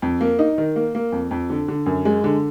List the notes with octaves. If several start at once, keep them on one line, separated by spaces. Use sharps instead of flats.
F2
A#3
D#4
D#3
A#3
A#3
F2
F2
D3
D3
F#2
G#3
D3